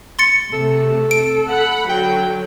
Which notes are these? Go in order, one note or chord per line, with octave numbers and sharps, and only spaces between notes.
C6 A6 C#7
C3 A3 A4
D7
F#5 B5
D3 F#3 G5